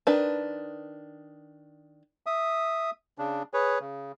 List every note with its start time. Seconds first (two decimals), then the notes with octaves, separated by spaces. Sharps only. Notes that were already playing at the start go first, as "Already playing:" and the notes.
0.07 D#3 D4 B4
2.26 E5 D#6
3.18 C#3 D4
3.54 G#4 B4 C#5
3.80 C#3